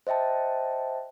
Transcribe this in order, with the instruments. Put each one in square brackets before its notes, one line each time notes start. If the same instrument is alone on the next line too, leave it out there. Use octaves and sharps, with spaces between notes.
[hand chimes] C5 D#5 E5 G5 A5